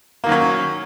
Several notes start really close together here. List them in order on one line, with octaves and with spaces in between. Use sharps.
A#3 D#3 F#3 C#4